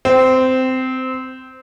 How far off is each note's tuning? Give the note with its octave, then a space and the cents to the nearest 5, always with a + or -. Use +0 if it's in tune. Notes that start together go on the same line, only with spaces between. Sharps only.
C4 -15